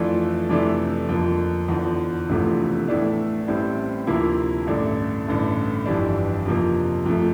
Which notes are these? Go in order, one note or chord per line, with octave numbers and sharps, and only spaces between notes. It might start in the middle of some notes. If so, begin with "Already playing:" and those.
Already playing: F2 E3 A3 D4 F4
F2 C3 E3 A3 D4
F2 D3 F3 A#3
E2 D3 F3
E1 E2 C3 F3 A3
A2 E3 A3 D4
A1 A2 G3 C4
D2 C3 F3 A#3 E4
A1 G2 D3 A3 D4
A1 G2 D3 A3
G1 F2 E3 G3 D4
F2 C3 F3 A#3
F2 C3 F3 A3